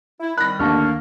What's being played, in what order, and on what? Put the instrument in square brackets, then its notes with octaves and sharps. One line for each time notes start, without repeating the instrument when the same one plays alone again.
[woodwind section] E4
[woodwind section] D#3 G3 [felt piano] B5 A#6 [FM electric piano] F#6
[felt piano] A1 D3 [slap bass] D#2 [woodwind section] A#3 [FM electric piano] A5 C#6 F6